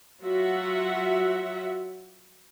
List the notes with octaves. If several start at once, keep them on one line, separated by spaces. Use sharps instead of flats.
F#3 F4 F#4 E5 F#5